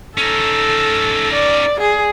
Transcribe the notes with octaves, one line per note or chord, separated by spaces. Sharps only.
C#4 D#4 A4
D5
G#4